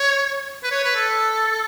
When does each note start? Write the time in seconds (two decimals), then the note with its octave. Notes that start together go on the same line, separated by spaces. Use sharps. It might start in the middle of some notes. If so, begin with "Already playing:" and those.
Already playing: C#5
0.64 B4
0.71 C#5
0.84 B4
0.95 A4